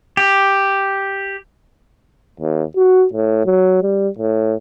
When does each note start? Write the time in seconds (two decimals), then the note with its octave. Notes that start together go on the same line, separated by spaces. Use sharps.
0.17 G4
2.40 D#2
2.76 F#4
3.13 A2
3.45 F#3
3.82 G3
4.18 A2